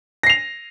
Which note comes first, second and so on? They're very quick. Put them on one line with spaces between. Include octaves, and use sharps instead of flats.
A#6 C7 F7